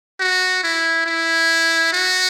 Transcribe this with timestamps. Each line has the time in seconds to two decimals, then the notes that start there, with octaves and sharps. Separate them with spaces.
0.20 F#4
0.63 E4
1.06 E4
1.93 F#4